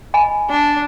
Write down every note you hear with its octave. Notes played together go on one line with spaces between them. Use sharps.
D#5 G#5 B5
D4